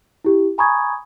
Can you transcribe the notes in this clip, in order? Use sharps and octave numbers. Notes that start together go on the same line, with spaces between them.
E4 G4
G#5 A#5 B5 C#6 D#6 G#6